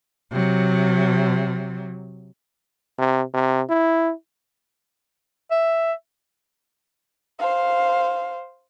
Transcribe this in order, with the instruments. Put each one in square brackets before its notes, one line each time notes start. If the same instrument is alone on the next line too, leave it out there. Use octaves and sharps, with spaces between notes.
[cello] C3 F#3
[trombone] C3
C3
E4
[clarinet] E5
[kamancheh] C5 F5